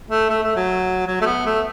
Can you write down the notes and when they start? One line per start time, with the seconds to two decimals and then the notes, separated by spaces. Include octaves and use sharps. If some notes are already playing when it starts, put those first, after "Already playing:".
0.11 A3
0.30 A3
0.43 A3
0.56 F#3
1.07 F#3
1.21 A3
1.26 B3
1.46 A3